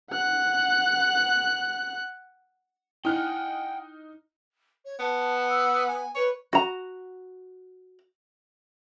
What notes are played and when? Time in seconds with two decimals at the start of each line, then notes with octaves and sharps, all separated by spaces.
0.11 F#5 F#6
3.05 D#4 E4 F#5 G5 F6 F#6
4.85 C#5
5.00 B3 A5
5.49 E6
5.87 G#5
6.16 B4 C#5
6.53 F#4 A#5